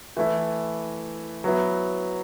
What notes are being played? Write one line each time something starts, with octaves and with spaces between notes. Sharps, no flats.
E3 A3 E4
F#3 B3 E4